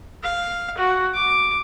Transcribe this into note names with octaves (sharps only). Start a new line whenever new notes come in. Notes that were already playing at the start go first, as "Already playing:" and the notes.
F5
F#4
D6